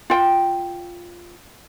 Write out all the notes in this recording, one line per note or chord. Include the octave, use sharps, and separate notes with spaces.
F4 G5